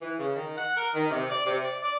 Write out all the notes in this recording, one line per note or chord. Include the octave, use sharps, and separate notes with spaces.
E3
C#3
D#3
F#5
A#4
D#3
C3
D5
C3
D5
D5